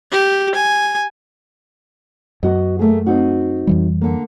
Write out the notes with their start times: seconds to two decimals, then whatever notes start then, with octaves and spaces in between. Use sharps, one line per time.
0.11 G4
0.55 G#5
2.43 F#2 B3 F#4 D#5
2.79 A3 A#3 G#4
3.06 C4 D#4 F#4
3.67 F2 E3 G3
4.01 D3 A#3